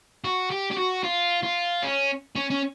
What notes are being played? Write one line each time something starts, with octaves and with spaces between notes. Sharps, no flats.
F#4
G4
G4
F#4
F4
F4
C#4
C#4
C#4